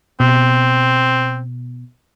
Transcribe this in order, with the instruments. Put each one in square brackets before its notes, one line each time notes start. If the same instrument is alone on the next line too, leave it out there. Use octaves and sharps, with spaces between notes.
[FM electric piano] B2 [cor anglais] C4